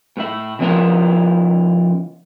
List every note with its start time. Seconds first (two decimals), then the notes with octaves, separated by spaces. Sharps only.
0.17 A2 A3 E4
0.59 C#3 F3 B3 C#4 E4 A#4